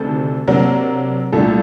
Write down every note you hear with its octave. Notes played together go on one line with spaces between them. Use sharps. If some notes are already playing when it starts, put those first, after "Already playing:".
Already playing: D2 C3 D#3 D4 A4
C3 F#3 A#3 D4 A#4
C2 A#2 A3 D4 A4